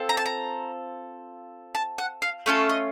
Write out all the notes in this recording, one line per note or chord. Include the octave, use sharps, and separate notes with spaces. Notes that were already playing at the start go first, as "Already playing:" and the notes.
Already playing: C4 F4 A4
A#5
A5
A#5
A5
F#5
F5
A3 C#4 F4 A4
D#5